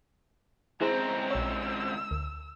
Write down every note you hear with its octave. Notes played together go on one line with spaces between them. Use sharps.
C#2 C4 E4 G#4 C5 A#5
A#1 C#5 E6
D2